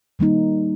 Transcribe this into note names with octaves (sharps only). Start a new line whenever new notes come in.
D#3 G3 A#3 D#4